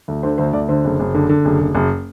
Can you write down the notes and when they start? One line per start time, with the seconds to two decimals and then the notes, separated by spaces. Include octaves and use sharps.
0.08 D2
0.23 D3 C5
0.38 D2 C5
0.53 D2 D5
0.69 D3 C5
0.85 F#1
0.99 F#1
1.15 D3
1.29 D3
1.45 F#1
1.60 F#1
1.75 F#1